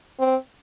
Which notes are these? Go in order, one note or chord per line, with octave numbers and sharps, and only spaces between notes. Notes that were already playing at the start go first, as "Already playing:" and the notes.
C4